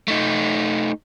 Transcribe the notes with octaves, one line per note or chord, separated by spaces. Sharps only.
A3 D#4